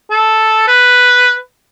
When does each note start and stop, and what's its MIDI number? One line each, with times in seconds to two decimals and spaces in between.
0.10 0.66 69
0.67 1.36 71